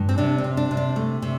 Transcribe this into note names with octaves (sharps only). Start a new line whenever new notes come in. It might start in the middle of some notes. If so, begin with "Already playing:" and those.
Already playing: G2
C4
C3 D4
C4
C3
D4
C3
D4
A3
C3